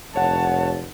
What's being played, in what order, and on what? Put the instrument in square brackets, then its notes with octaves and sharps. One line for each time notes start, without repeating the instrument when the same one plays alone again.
[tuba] F1 [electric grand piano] C#5 F#5 [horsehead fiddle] A5